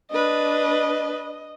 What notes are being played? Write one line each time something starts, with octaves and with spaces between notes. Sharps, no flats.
D4 B4 D#5